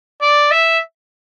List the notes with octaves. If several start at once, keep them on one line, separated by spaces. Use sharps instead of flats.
D5
E5